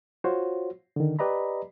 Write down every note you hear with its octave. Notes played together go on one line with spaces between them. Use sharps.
F4 F#4 C5 C#5
D3 D#3
G4 B4 D5 D#5 A#5 B5